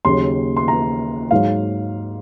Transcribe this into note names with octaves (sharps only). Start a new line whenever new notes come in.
D#2 C#3 F#3 C6
C6
A#5
G#2 F#3 F5